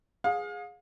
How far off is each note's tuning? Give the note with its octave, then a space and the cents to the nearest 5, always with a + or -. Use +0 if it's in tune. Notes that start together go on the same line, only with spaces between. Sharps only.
G#4 +0 F5 +40